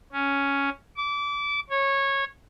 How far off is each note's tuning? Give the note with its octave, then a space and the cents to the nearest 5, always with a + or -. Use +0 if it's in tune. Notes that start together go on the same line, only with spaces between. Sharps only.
C#4 +5
D6 -25
C#5 -15